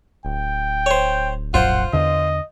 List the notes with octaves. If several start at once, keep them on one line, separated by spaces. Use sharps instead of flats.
D1 G5
C5 C#5
A#1 F#2 F4 C5 F#5
E2 D3 D#5